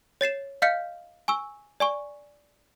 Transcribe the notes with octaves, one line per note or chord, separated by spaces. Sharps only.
C#5 A6 C7 E7
D#5 F5 F6 G6 B6 C#7
G#5 C#6 E6
D5 G#5 C#6